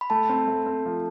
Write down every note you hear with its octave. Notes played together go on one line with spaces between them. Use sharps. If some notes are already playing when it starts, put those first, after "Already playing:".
B5
A3 A5
C4
A3
C4
F3